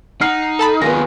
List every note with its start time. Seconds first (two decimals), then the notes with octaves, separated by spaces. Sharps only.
0.21 D#4 F#5 F6 C7
0.59 A4 A5 B5
0.82 D#2 D#3 B3 F4 G#4 A#6